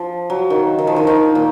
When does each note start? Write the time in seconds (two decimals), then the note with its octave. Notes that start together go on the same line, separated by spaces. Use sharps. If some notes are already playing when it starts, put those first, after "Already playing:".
Already playing: F3
0.30 F#3
0.50 D#3
0.78 D#3
0.87 F3
0.96 D#3
1.07 D#3
1.35 A#2